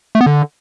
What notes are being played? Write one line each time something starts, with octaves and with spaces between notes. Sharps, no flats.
A3
B3
D3